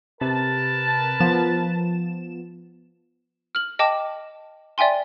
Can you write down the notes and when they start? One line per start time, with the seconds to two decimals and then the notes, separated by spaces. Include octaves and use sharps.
0.21 C3 A#4 B4 A5
1.20 F3 B3 E7
3.55 F6 F#7
3.79 D#5 G5 A5 D6
4.78 D5 E5 G5 G#5 C6